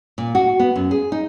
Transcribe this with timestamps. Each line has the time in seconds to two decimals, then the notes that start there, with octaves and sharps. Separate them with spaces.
0.18 A#2
0.35 F#4
0.60 B3
0.76 F#2
0.91 G#4
1.12 D#4